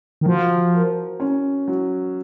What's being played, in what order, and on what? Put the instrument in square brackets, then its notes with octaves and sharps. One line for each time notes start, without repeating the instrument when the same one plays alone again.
[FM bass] D#3
[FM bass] F3 [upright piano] F#4
[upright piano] A#4
C#4
F#3